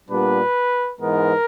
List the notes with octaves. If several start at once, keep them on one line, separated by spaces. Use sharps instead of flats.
A#2 G3 B3 D4 B4
G#2 E3 G#3 B3 A#4